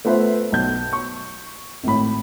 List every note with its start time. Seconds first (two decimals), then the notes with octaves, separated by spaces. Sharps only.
0.05 A3 B3 F4 B4 C5 E5
0.52 B1 G6
0.93 C#6
1.83 G#1 A2 B5